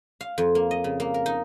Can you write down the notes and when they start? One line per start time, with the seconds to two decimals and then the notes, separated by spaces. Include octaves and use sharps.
0.21 F5
0.38 F2
0.55 A#3
0.71 D#5
0.84 C#3
1.00 A#3
1.14 A#4
1.26 D#4